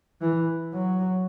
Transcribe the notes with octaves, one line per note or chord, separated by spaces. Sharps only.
E3
F#3